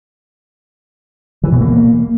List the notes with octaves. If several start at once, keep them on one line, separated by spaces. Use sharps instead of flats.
E3
B2
A#3